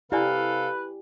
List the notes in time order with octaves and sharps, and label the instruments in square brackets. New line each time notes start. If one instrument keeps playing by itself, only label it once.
[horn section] C3 A4 F5 [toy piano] E4 D5 G#5 [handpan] G4 [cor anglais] B4